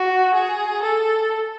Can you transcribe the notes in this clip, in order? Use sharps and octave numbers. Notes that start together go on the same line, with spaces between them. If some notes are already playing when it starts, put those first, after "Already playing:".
Already playing: F#4
G#4
A4